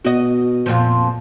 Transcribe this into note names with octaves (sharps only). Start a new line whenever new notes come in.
B2 F#4 D#5
F2 A#2 F3